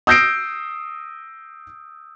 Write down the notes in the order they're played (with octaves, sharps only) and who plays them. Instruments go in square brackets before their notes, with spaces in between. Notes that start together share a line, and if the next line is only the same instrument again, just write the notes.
[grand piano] D#6 E6 G6 A#6 C7 D7